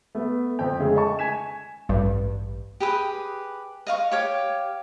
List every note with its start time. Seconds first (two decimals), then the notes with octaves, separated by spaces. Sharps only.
0.15 A3 B3
0.59 F2 C4 G5
0.80 C#3 G#3 A3
0.96 D#5 A5 C#6
1.19 G#5 G#6 B6 E7
1.89 A1 G2
2.80 G4 G#4 B4 D#6
3.87 D#5 F5 C#6
4.12 G4 C#5 F5